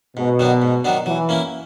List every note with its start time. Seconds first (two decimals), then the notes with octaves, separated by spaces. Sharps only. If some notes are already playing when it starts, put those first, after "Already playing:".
0.17 G#2 B2
0.39 D#3 F#3 B3 D4
0.62 G#2
0.85 D#3 F#3 B3 D4
1.06 E3 F#3
1.29 A#3 C#4 E4